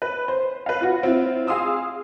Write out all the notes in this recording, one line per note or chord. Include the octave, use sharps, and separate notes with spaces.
B4
C5
B4 F5
F4 F#4
C4 E4 F4
G#4 F5 C6 D#6 E6